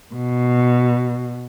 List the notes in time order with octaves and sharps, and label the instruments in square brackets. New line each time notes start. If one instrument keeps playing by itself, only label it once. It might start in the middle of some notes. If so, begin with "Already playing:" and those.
[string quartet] B2